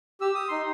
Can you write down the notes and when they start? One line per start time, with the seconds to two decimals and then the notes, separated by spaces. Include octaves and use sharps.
0.21 G4 E6
0.35 D#6
0.48 D#4 C6